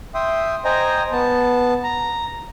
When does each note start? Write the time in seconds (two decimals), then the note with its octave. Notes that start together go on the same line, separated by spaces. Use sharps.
0.14 E5 G5 C6 D#6
0.65 C5 D#5 G5 G#5 A#5
1.12 B3 A5
1.84 A#5